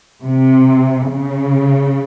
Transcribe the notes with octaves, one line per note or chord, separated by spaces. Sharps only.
C3
C#3